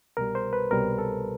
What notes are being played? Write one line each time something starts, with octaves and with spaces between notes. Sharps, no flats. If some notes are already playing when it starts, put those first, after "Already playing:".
C2 B2 G3 A#4
C5
B4
C2 B2 G3 A#4
A4